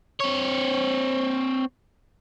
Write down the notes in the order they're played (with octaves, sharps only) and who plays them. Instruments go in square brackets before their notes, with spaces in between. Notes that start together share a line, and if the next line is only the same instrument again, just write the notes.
[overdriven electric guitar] C4 C#5